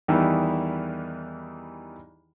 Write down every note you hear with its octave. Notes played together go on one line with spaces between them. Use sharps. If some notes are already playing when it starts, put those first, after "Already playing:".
E2 D#3 E3 G3 D#4 E4